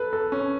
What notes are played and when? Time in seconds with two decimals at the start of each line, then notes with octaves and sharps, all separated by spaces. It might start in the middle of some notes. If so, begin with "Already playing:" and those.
Already playing: A4 B4
0.13 A4
0.32 C#4